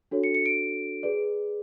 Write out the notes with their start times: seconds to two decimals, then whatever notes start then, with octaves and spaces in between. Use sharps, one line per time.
0.11 D4 F#4 A4 C#5
0.24 C#7
0.35 C#7
0.46 D7
1.03 G#4 B4 D5